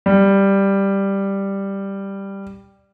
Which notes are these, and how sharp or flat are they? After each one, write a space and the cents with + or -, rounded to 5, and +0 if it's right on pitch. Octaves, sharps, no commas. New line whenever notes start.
G3 +5